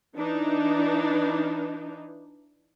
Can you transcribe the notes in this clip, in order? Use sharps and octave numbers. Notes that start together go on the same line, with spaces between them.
E3 D4 D#4